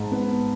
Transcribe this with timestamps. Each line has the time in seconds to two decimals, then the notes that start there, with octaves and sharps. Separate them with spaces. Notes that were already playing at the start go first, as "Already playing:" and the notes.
Already playing: G#2 A5
0.12 B3